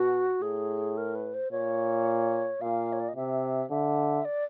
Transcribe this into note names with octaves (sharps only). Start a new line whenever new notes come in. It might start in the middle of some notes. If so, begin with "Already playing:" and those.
Already playing: B2 F#4
A2 G#4
A#4
B4
C5
A#2 C#5
A#2 F5
C#5
D5
D#5
C3 E5
D3 E5
D5